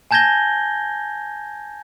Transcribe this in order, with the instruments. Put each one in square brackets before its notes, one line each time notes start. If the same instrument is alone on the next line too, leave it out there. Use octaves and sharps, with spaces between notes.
[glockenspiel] G#5 A5 G6 G#6 A#6 G7